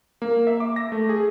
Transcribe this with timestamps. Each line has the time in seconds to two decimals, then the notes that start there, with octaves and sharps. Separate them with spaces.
0.22 A#3
0.47 E5
0.60 D6
0.76 A#6
0.92 A3
1.09 G#4